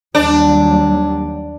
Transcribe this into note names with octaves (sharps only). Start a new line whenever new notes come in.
D#2 F#3 G3 D4